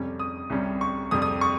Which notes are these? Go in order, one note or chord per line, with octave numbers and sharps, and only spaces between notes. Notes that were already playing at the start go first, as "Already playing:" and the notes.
Already playing: F2 C3 G3 C#4
D#6
C2 C3 G3 C#4
C#6
F2 C3 G3 D#6
D#6
C#6